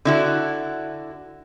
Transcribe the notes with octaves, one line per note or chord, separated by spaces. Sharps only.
D3 E4 F#4